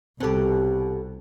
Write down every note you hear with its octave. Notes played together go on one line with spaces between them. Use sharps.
C2 B2 C4 G4 A4